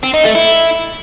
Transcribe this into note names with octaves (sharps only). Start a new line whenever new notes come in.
C4
D#4
A3
E4